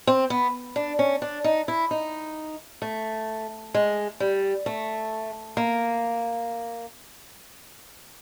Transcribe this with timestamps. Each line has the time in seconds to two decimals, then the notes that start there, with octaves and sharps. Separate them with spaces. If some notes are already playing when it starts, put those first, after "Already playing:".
0.07 C4
0.30 B3
0.76 D4
0.99 C#4
1.22 D4
1.44 D#4
1.68 E4
1.91 D#4
2.82 A3
3.74 G#3
4.20 G3
4.66 A3
5.57 A#3